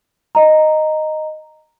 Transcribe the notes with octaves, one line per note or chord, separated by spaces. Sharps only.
D#5 A#5